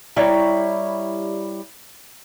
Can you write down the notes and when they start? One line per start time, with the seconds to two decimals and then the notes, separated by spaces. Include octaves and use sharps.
0.16 G3 E4 C#5 A#5